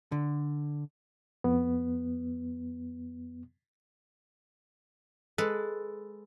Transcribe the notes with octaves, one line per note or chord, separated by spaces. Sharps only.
D3
F2 B3
G#3 A4 B4